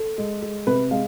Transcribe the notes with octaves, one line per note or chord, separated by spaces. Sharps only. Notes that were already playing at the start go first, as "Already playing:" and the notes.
Already playing: A4
G#3
G#3
C3 B4
G#3 F5